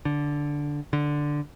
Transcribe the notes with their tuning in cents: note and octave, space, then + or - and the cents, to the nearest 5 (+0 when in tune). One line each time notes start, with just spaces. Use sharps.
D3 -5
D3 +0